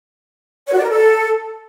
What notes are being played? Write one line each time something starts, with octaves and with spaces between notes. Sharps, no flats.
C#5
F#4
D5
A#4
A4